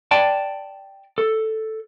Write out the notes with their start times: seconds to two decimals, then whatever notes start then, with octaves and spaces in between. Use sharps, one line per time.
0.11 D5 G5 A5
1.18 A4